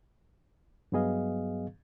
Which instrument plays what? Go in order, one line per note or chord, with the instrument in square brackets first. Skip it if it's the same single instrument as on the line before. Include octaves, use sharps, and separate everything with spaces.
[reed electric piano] G2 F#3 B3 G#4 D#5 F5